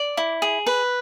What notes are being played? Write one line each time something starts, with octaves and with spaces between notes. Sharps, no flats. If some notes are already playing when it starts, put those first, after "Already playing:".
Already playing: D5
E4
G#4
B4